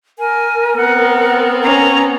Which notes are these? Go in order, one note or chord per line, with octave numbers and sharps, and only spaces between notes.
A#4 G#5
B3 C4 F#5
C#4 A#5